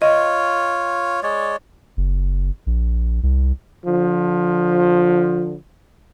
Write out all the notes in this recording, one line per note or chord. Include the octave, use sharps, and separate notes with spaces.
F4 C#5 D#5
G#3 C#5 D5
F#1
A#1
C2
D3 F3